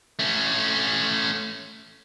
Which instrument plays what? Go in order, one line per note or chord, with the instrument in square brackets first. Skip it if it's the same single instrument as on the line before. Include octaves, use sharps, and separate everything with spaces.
[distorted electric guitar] A3 C#4